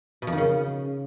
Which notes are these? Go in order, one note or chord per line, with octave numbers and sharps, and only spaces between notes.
B2
F2
D#3
C#3